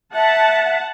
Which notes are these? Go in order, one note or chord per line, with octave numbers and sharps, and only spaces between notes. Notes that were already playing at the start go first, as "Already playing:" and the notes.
E5 F#5 A5